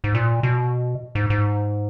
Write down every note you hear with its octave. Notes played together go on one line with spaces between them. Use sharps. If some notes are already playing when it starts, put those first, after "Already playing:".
G#2
A#2
B2
G#2
G#2